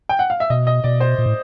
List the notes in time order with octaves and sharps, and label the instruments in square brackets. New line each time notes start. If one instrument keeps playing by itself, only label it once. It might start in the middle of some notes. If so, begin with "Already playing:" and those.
[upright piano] G5
F#5
F5
E5
[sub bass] B2 [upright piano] D#5
[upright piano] D#5
[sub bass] B2 [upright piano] D5
[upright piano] C5
[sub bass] A#2
A2